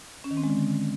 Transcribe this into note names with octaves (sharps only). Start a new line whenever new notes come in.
C#4
D#3
C4
G#3
D3